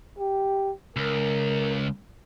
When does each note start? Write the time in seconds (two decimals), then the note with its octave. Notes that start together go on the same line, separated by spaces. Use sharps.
0.19 G4
0.96 C#2 A#4